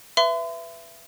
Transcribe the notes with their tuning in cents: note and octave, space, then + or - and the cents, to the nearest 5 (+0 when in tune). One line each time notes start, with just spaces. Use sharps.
B4 +0 E5 +25 C6 -45